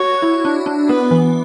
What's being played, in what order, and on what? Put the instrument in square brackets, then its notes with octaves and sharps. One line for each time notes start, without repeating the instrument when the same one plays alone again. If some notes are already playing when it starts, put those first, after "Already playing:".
Already playing: [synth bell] F#4 [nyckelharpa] C#5
[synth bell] E4
D4
D4
[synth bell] B3 [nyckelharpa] B4
[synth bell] E3